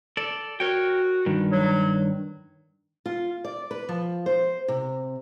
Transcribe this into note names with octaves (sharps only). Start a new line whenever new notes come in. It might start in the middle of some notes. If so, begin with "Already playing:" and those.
A4 D5
F#4 A#4 C#5 G5
G2 D#3
F#3
F4
D5
B4
F3
C5
C3